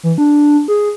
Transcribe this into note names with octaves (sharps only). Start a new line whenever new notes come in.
E3
D4
G#4